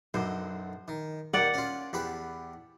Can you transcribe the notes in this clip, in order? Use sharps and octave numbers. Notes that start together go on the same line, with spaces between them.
B1 F#2 D3 C5
D#3
D#2 D#3 D5 F#5
C#4 F4
E2 G4 B4